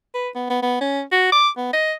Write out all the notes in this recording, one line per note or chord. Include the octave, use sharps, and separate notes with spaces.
B4
B3
B3
B3
C#4
F#4
D6
B3
D#5